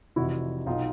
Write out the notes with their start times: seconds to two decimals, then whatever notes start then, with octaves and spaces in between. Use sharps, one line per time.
0.16 F1 F2 C3 E3 E4 F#4
0.66 B1 B2 D#4 F4